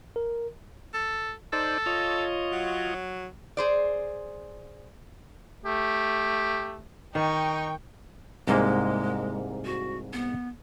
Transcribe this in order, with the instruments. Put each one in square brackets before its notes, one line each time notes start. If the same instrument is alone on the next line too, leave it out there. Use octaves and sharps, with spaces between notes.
[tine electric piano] A#4
[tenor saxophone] A4
[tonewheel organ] D#4 C5 D5 [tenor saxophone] A4
[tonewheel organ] F4 C#5 D#5
[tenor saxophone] F#3
[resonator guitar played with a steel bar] G#4 C5 D5
[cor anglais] A3 [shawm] G4
[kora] D#3 [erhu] D#4 [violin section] G5 [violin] C#6 D#7
[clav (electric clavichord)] C2 G#2 A#3 [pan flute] G#3
[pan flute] F#4
B3